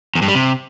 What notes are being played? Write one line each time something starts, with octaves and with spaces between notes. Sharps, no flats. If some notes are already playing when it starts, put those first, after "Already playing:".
E2
G2
G3
C3